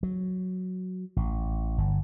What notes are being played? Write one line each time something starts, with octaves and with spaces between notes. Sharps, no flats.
F#3
A1
G1